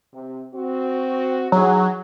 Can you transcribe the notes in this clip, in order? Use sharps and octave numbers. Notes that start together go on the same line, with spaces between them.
C3
C4 F#4
E3 F#3 D#4 G#4